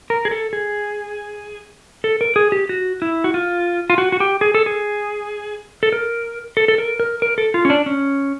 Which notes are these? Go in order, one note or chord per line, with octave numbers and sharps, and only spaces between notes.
A#4
G#4
A4
G#4
A4
A#4
G#4
G4
F#4
E4
F#4
F4
F4
F#4
F#4
G4
G#4
A4
G#4
A4
A#4
A4
A4
A#4
A#4
A#4
A4
F4
C#4
D4
C#4